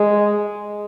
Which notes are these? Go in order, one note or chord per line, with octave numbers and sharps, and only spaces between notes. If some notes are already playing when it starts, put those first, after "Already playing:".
Already playing: G#3